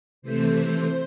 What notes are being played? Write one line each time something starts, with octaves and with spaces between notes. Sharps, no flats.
C3 E3 A3 C5